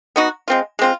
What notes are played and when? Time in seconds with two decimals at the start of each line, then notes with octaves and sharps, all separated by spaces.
0.16 B3 D#4 F#4
0.48 G#3 C4 F4
0.79 G#3 C4 F4